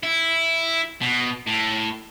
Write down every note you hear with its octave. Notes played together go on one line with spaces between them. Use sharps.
E4
B2
A2